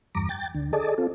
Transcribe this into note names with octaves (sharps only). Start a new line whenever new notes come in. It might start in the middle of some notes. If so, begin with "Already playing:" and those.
E2 G2 A#5 D6
G5 A6
D2 D3
G#4 A4 D5 D#5 A5
C4 F4 A4